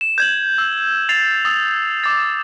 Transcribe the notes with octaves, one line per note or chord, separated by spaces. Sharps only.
E7
G6 G#6 F#7
E6
A6 C7 F7
D#6 E6 A6
D6 A6